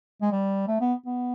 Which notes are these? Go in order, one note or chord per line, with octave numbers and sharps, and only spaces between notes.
G#3
G3
A3
B3
B3